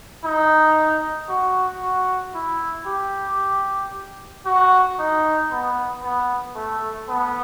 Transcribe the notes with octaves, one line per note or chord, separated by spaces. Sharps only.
D#4
F#4
F#4
E4
G4
F#4
D#4
B3
B3
A3
B3